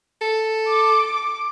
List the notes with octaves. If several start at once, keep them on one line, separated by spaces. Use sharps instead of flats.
A4
D6